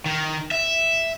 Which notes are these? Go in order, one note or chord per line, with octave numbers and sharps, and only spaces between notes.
D#3
E5